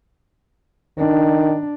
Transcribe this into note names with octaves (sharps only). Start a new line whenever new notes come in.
D#3 D4